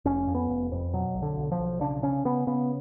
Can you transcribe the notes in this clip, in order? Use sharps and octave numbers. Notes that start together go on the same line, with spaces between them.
F1 C#4
F2
B3
F1
F2
B2 F#3
B1
D3
B1
F3
B1
C#3 D4
C#3 C#4
C#3 B3
C#3 B3